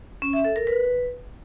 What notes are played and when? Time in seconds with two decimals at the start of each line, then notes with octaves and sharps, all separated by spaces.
0.22 C#4
0.33 E5
0.45 A4
0.56 A#4
0.67 B4